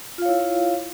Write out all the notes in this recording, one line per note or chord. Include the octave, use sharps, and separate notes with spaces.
E4 F4 C#5 F5